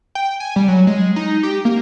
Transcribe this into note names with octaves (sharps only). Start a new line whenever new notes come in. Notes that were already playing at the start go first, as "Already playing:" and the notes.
G5
G#5
G3
F#3
G#3
D#4
G4
A#3